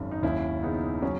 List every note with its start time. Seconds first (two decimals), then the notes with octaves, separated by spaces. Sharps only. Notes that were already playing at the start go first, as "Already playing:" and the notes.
Already playing: G#1 F#2
0.11 D#4
0.23 D#2 C#4 E4
0.63 C#3 B3 D#4
1.02 F#3 C#4